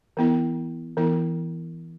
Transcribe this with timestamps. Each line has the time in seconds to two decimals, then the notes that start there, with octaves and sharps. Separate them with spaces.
0.17 E3 B3 E4
0.97 E3 B3 E4